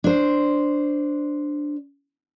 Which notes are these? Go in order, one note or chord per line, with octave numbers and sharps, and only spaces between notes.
D4 C5